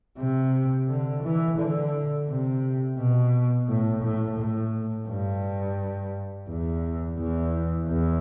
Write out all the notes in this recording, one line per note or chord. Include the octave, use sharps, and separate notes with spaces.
C3
D3
E3
D3
C3
B2
A2
A2
A2
G2
E2
E2
E2